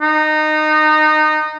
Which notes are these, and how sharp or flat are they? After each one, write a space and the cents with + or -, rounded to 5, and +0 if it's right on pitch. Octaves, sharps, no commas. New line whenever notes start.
D#4 -20